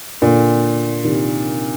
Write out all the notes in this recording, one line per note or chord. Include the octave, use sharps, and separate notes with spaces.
A#2 D3
C3 D#3